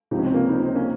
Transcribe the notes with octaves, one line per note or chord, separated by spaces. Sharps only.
C#2 C3 F3 D#4
C#4
C4
A#3 C#4
D#4
C#4
C4
A#3 C#4